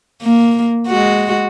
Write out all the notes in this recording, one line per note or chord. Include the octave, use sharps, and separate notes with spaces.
A#3
G#3 F#4